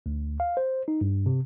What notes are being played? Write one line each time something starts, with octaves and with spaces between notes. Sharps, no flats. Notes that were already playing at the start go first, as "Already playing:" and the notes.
D2
F5
C5
D#4
G2
C3